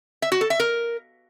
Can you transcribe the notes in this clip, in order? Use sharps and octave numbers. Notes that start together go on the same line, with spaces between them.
E5
F#4
A4
E5
A#4